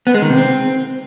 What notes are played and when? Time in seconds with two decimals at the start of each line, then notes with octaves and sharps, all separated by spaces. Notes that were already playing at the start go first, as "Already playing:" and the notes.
0.07 B3
0.14 G#3
0.22 D#3
0.30 C3
0.37 C4